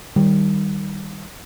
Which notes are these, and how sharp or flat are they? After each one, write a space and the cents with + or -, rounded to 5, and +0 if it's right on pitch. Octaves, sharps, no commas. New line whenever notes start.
D#3 +0 G3 +0